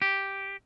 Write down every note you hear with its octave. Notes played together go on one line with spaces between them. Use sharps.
G4